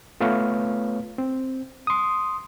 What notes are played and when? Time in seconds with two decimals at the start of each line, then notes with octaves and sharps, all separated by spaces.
0.21 A3 B3 F4 B4 C#5 F5
1.18 C4
1.87 C6 D#6